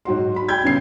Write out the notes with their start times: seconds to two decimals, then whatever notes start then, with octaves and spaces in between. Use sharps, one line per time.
0.05 G#2 F#3 F#4 C6
0.36 B5
0.49 G5 B5 G6 G#6
0.63 G1 C#3 C7